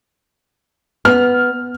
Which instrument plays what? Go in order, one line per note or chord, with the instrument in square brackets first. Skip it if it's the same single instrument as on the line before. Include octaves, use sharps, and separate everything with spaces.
[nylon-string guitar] B3 [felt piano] F6